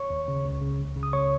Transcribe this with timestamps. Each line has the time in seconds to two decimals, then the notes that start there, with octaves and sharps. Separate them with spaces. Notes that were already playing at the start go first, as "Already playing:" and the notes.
Already playing: C#5 C#6
0.10 D#2
0.28 C#3
0.45 C#2
0.62 C#3
0.79 C#2
0.96 C#3
1.03 D#6
1.13 C#2 C#5 C#6